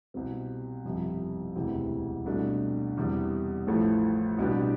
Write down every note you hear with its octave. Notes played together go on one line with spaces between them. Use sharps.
C2 B2 G3 C4
G1 F2 C3
E1 D2 C3 E3
C2 B2 A3 D4
E2 C3 G3
A1 A2 F3 A3
C2 B2 B3 D4 G4